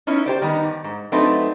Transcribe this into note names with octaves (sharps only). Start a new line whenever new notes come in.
B3 C#4 D#4 E4
G4 C5 D5
D#3 G3 B3 D#4
G2
G#2
F#3 A3 C4 D4 D#4 B4